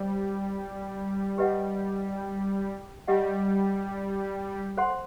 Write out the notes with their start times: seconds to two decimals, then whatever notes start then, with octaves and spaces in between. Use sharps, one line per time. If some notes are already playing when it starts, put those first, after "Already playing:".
Already playing: G3 C5
1.38 G4 B4 D#5 F#5
3.08 G3 G4 D#5 F#5
4.77 A4 C5 F#5 C6